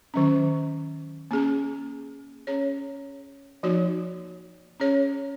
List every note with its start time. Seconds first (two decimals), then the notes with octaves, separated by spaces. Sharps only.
0.14 D#3 F#3 C#4
1.31 A#3 C#4 G#4
2.47 C#4 G#4 C#5
3.63 F3 A#3 D#4 F#4 C#5
4.80 C#4 G#4 C#5